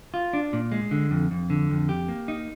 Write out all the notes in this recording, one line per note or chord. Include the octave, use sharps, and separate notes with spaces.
F4
D4
A#2
G#3
D3
F2
F2
D3
F2
G4
A#3
D#4